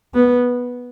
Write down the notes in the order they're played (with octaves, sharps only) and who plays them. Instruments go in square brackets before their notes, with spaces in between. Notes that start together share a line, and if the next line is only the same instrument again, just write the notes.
[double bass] B3